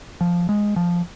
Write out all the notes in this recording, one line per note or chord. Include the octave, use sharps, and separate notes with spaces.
F3
G#3
F3